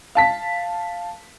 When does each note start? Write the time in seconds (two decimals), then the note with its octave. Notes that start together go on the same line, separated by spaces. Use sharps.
0.15 F5 A5 B6